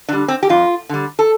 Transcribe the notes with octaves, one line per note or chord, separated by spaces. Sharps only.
D3 G3 D4
C4
G4
F2 F4
D3 G3
A4